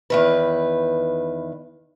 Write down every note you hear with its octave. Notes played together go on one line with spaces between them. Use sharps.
E2 D#3 B4